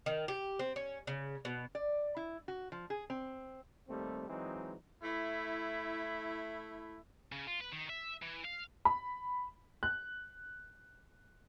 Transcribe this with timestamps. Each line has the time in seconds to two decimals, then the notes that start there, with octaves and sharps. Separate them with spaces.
0.06 D#3
0.28 G4
0.59 C4
0.76 C#4
1.07 C#3
1.45 B2
1.75 D5
2.17 E4
2.48 F#4
2.72 F3
2.90 G#4
3.10 C4
3.88 D#2 G3 A3 C4
4.29 E3 F#3 G#3 C4 D#4
5.03 A3 E4
7.32 C#3
7.47 F4
7.61 B4
7.72 D#3
7.90 E5
8.22 E3
8.45 F5
8.85 B5
9.83 F#6